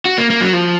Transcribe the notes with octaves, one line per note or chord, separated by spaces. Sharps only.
F#4
A#3
A#3
F#3
F3